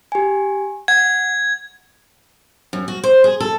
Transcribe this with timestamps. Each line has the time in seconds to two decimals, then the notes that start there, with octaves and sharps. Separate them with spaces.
0.12 G4 G#5
0.88 F#5 G#6
2.73 F#2
2.88 F#4
3.03 C5
3.24 G#4
3.40 A4